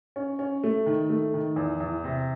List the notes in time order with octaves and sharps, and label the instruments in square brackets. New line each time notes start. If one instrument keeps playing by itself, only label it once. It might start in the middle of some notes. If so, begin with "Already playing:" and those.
[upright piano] C#4
C#4
A3
D#3
A3
D#3
E2
E2
C3